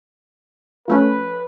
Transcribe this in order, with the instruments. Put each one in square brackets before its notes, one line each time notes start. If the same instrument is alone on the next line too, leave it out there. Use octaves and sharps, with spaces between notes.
[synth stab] F3 A3 C#4 [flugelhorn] B4